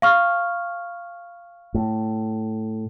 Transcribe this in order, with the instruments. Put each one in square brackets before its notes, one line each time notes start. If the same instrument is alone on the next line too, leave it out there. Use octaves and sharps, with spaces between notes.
[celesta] F5 C#6 F6
[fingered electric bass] A2